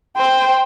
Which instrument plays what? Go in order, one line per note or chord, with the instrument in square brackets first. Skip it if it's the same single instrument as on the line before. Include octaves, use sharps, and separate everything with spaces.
[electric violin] C5 [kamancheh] G5